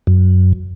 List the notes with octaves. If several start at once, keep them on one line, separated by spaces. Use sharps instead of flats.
F#2